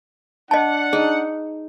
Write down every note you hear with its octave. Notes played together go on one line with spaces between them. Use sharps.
D4 D#5 F#5 A5
D#4 G#4